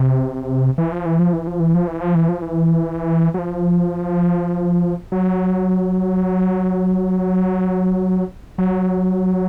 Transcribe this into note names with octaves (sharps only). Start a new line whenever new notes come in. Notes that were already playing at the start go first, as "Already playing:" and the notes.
Already playing: C3
E3
F3
E3
F3
E3
F3
E3
F3
E3
F3
E3
F3
E3
F#3
F3
F#3
F#3